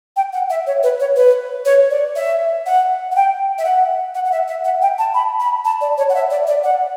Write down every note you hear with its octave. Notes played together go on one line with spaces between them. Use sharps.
G5
F#5
E5
C#5
B4
C#5
B4
C#5
D5
E5
F#5
F#5
G5
E5
F#5
F#5
F#5
E5
E5
F#5
G5
A5
B5
B5
A5
D5
C#5
F#5
E5
D5
D5
F#5